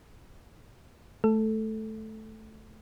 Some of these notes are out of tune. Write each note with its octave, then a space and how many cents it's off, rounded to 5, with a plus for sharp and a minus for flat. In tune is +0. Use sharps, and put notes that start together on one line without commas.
A3 -15 A4 +0